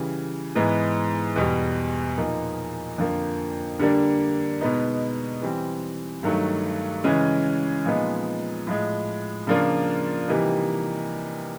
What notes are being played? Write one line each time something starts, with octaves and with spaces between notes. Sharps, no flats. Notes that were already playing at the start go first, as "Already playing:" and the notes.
Already playing: C#3 E3 G3
G#2 E3 G#3 B3
E2 B2 G3
A#2 F3 A#3 D#4
F2 D3 F3 A#3
D3 G3 A#3 D4
B2 G#3 B3 D#4
E3 G3 C4
G2 D#3 F#3 A3
C#3 E3 G#3 C#4
A#2 F3 G#3 B3 D#4
A2 F3 G#3
C#3 F3 A#3 D4 F4
C3 E3 G3 A#3 D#4